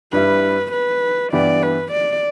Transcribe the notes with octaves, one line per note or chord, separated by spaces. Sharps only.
G2 G3 E4 B4
B4
G2 E3 B3 G4 D5
B4
D5